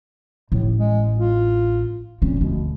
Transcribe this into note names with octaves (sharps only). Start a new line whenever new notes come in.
A1 A2
G#3
F4
A#2 C4 C#4
D2 B2